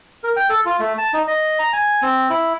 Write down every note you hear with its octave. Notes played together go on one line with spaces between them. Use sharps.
A#4
G5
A4
F4
A3
A5
D#4
D#5
A#5
G#5
C4
E4